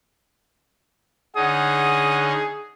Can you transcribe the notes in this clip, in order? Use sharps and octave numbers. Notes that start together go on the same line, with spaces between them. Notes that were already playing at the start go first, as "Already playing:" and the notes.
D3 C#4 D#4 G#4 F#5 D#6